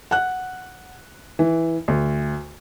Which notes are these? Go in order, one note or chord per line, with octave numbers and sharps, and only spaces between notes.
F#5 F#6
E3
D2